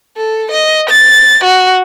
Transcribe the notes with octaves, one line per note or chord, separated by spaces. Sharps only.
A4
D#5
A6
F#4